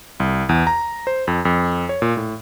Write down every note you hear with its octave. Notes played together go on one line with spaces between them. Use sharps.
C2
E2
A#5
C5
F2
F2
C#5
A#2
A2